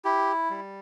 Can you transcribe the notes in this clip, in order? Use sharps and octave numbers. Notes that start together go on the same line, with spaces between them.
E4 G4
G3